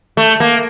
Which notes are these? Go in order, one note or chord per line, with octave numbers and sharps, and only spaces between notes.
A3
A#3